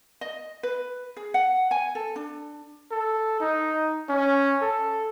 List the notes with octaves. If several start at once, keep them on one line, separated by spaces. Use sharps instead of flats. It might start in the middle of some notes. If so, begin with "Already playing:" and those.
D#5
B4
G#4
F#5
G#5
A4
D4
A4
D#4
C#4
A4